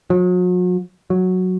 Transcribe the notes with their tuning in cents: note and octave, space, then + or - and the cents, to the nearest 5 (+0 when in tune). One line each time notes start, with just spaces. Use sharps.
F#3 -40
F#3 -5